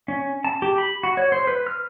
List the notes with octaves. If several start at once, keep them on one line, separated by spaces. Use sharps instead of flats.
C#4
A5
G4
B5
F#4
C#5
C5
B4
F6